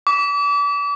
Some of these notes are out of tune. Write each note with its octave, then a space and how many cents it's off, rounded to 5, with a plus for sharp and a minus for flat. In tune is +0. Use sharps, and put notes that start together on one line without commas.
D6 -35